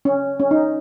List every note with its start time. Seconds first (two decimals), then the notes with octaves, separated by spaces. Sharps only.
0.05 C#4
0.39 C#4
0.51 D#4